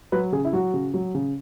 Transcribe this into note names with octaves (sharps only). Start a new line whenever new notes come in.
F#3 B4
C#3 G#4
E4
F#3 F#4
C#3
F#3
C#3